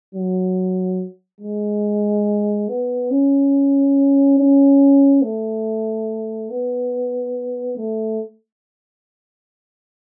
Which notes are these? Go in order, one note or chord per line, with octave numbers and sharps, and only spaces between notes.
F#3
G#3
B3
C#4
C#4
A3
B3
A3